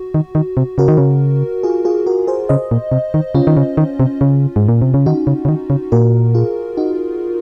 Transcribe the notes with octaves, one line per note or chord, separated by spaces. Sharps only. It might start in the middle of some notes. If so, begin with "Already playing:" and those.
Already playing: F#4
D#3
D#3
C3
C#3 F#4 A#4
D#3
C#3
F4 G#4
F4 G#4
F#4 A#4
G#4 C5
C#3 C5 D#5
A#2
C3
D#3
C#3 C#4 F4
D#3
C#3
D#3
C3
C#3
G#2
A#2
C3
C#3
D#3 D#4 F#4
C#3
C#3
D#3
C#3
A#2 F#4 A#4
F4 G#4
D#4 F#4